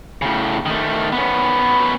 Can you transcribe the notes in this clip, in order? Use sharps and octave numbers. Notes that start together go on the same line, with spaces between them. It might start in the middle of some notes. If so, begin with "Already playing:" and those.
A2 C#3
D#3 A3
B3 C#4